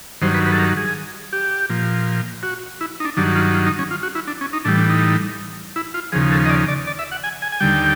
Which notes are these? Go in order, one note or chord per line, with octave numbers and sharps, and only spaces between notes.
G2 D#3 F#3 C5
B4
B4
A4
A#4
G#4
G4
A#2 F3
F#4
E4
D#4
D4
G2 D#3 F#3 D4
F4
F4
D#4
C#4
F4
F#4
E4
D4
C#4
D#4
A2 E3 G3 D4
D4
D#4
E4
F4
D#2 C#3 F3 G#4
A4
D#5
D5
D5
D5
E5
F#5
G#5
G#5
G#5
D#2 D3 G3 G5